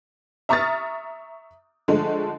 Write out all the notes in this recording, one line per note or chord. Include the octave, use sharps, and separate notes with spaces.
E5 A#5 C#6 D#6 F6 A6
D3 F3 G#3 A3